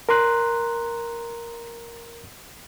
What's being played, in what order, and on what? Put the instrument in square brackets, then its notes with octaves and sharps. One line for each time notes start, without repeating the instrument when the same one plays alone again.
[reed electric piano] A#4 A#5 C6 F#6